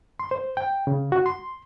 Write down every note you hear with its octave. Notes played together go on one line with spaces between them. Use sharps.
C6
C5
G5
C#3
F#4
C6